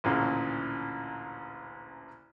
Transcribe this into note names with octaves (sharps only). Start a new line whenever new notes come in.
A1 D2 A#2 C#3